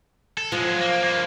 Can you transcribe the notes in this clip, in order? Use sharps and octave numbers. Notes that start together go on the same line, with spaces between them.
A4
F3 F#3 G#3
A#3
G2 A#3